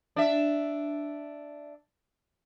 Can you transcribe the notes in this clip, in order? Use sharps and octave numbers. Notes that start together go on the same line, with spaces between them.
D4 E5